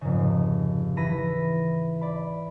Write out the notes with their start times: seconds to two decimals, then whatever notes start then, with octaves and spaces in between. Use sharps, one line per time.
0.01 F1 G#2 C#3
0.97 E3 B5 A#6 B6 D#7
2.01 D5 B5